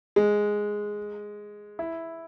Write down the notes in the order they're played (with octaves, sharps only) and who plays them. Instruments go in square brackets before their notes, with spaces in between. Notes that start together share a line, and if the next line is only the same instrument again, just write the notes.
[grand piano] G#3
E4